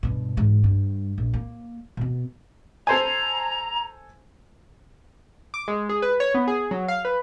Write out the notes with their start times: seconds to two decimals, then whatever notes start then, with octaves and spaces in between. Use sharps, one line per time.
0.03 G2 B2
0.37 G#2 E3
0.64 G2
1.18 A#1
1.33 A#3
1.97 B2 B3
2.87 A4 C5 G#5 A#5
5.54 D6
5.68 G#3
5.89 G#4
6.02 B4
6.20 C#5
6.34 B3
6.48 G#4
6.71 F#3
6.88 F5
7.05 B4